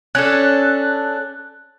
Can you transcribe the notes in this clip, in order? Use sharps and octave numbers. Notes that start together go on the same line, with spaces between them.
C#4 D4 A4 F#6